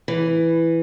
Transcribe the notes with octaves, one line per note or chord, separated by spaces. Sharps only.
E3